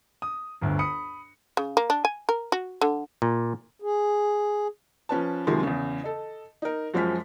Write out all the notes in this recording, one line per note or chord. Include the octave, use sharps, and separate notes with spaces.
D#6
G1 D2
B5 D#6 C#7
C#3
A#3
D4
G#5
A#4
F#4
D3
A#2
G#4
F3 C#4 B4 A5
F#2 C3 D#3 F3 G#3 C6
E2 C#3
A4 D#5
D#4 A#4
F#2 F3 G#3 C5 F6 B6